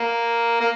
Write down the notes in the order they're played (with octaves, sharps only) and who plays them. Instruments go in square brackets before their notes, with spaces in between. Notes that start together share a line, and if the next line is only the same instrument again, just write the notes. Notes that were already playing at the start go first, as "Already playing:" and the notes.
Already playing: [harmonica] A#3
A#3